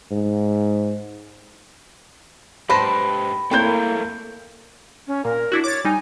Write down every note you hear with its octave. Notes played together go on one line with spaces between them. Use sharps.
G#2
G#2 G4 B4 C5 A5 B5 A#6
A3 A#3 C4 E4 A#4 C#5 G5 G6
C#4
A#2 A#4
D4 E4 F#4
C#5 D6 A6
G3 D#4 G#5